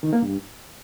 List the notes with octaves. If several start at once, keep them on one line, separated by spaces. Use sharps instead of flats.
D#3
A#3
G2